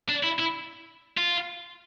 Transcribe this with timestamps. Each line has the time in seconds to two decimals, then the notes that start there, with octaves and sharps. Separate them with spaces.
0.09 D4
0.24 E4
0.40 E4
1.17 F4